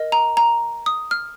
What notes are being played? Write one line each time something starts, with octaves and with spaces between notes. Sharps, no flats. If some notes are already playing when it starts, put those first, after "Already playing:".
Already playing: A#4 D#5
A#5
A#5
D#6
F6